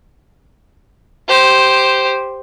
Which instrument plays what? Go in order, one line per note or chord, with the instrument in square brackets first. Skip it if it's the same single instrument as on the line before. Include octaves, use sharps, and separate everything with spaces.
[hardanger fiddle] G4 C5